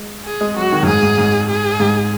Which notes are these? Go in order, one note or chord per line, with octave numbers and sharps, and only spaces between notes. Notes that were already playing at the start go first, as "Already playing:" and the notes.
Already playing: G#3
G#4
G#3
F#3 F#4
D#3
F#2
G#2 G#4
G#2
G#2
G#4
G#2